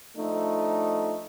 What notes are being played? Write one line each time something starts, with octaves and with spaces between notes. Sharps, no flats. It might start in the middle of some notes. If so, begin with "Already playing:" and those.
F3 A3 D4 D#4